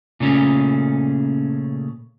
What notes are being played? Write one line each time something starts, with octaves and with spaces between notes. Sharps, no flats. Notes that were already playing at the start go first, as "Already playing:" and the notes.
A#2 C#3 A3 C#4